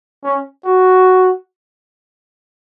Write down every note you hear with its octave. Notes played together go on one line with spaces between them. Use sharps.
C#4
F#4